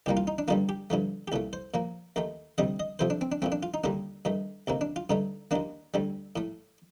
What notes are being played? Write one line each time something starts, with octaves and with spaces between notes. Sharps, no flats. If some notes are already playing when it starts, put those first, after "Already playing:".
C2 A#2 G3 A#3 G4
F4
D#4
D4
G2 D3 G3 A#3 F4
G4
G2 D3 F3 A3
G4
C2 A#2 A3 A4
C5
A#2 F3 A#3
D#2 D#3 A3
D2 C3 G3 D#5
D#5
F2 C3 F3 A3 C5
D4
C4
D4
A#2 F3 A3 C4
D4
F4
D#4
D#2 D3 G3 A#3 D4
G2 D#3 A3
D2 C3 D#3 A#3
D4
F4
G2 D3 A3 D#4
D#2 D#3 A#3 D4
D2 D3 G3
A2 A3